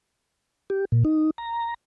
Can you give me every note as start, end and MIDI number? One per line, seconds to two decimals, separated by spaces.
0.70 0.85 67
0.92 1.03 46
1.05 1.30 63
1.38 1.74 82